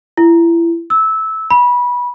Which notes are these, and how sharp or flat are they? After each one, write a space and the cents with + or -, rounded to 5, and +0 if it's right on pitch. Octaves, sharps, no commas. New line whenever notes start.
E4 +30
E6 -15
B5 -20